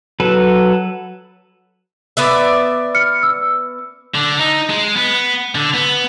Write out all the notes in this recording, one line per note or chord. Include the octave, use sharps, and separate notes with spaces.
F#3 A4 B4
B3 D5 E5
F6 C#7
E6
D3
D#4
G#3
B3
D3
B3